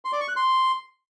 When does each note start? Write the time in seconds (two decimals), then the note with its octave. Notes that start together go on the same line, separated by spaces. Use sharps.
0.05 C6
0.13 D5
0.20 C#6
0.28 F#6
0.36 C6